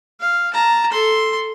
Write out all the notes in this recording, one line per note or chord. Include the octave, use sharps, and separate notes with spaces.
F5
A5 A#5
A4 C6